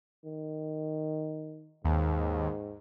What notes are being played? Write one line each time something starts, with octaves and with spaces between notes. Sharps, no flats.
D#3
D#2 G#2